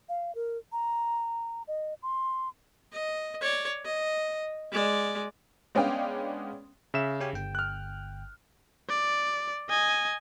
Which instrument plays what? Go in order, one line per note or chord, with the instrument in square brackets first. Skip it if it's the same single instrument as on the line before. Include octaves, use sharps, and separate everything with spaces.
[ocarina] F5
A#4
A#5
D#5
C6
[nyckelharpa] D#5
C#5 D5
D#5
G#3 D5
[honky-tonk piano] G#3 B3 C#4 D4 F5 G5
[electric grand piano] C#3 E5 E7
[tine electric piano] C#4 G4 G#5
G1 G5
[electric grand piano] F6 F#6
[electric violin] D5
D#5 G#5